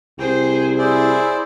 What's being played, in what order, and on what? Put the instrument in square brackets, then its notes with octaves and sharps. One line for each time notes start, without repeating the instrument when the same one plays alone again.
[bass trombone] C2 [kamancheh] G#4 C5 [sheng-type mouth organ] G5
[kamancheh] E4 [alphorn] G#4 [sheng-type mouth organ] C5 D5